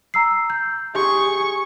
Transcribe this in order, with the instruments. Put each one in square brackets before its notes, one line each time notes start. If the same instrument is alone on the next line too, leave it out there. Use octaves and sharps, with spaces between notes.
[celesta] A#5 E6 C7
G6
[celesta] G4 [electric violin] G#4 C#6